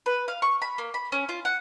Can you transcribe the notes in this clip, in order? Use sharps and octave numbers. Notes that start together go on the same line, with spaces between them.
B4
F5
C#6
B5
A#3
B5
C#4
F4
F#5